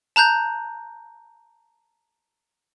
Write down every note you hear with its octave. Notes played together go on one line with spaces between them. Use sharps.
A5 A#5 F#6 G6